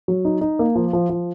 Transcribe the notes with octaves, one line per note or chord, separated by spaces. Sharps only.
F#3
D#4
D#4
A#3
F3
F3
F3